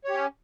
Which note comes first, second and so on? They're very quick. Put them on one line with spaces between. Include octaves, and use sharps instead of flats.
C#5 G4 C#4